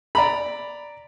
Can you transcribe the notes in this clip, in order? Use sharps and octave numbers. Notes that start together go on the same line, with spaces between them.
D5 A#5 B5